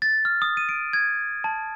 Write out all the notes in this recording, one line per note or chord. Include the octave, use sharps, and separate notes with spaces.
A6
F6
D#6
D#7
D7
G#6
A5